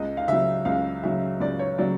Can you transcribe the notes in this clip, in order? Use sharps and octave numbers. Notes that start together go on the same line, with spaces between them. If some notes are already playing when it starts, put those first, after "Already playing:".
Already playing: C#2 D#5
F5
C#3 F#3 E5
C#2 F5
C#3 F#3 E5
C#2 D5
C#5
C#3 F#3 D5